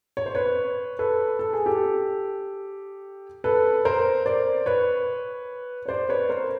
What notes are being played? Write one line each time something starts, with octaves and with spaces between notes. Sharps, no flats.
C#5
C5
B4 C#5
A4 B4
A4
G#4
G4 A4
A4 B4
A#4 C5
C5 D5
B4 C#5
C#5
C5 D5
B4 C#5
A#4 C5